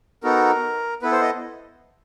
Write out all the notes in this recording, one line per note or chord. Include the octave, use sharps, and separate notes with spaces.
B3 D#4 F#4 A4 A#4
B3 E4 A4 B4
C5
D#5